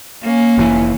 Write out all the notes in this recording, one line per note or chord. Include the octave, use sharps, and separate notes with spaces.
A#3 C#4
F1 A2 E3